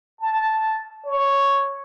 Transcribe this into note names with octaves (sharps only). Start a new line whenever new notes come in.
A5
C#5